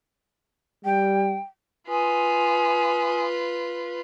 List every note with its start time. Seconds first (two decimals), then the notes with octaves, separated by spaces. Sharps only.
0.85 G3 G5
1.88 F4 B4 G#5 C6 D#6